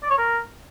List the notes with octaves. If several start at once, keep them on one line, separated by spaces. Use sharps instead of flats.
D5
C#5
A#4